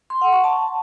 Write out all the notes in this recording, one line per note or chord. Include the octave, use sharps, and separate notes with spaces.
C6
F#5
C#6
A5